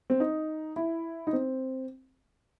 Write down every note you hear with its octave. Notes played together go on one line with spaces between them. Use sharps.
C4
D#4
E4
D#4
C4